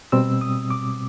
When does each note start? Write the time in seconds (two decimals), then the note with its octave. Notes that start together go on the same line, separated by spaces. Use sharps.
0.12 B2 G3 C4 E6
0.41 D#6
0.70 D6